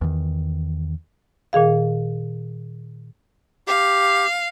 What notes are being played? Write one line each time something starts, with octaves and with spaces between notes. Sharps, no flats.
E2 D#3
A#2 D#3 G#4 F5
G4 F5